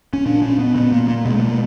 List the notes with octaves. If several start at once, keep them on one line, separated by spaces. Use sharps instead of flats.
C#4
A#2 D4
C#4
B3
A#2 B3
A#3
A#3
B2 G#3
A3
A#3